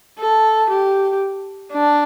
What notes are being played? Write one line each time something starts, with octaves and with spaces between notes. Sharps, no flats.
A4
G4
D4